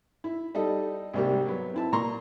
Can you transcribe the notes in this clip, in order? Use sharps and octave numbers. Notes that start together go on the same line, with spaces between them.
E4
G3 D#4 A4 D#5
C2 G#2 G3 A#3 G4
F#3 B3
C4 E4 A5
A#2 A#3 A#5 C6 C#6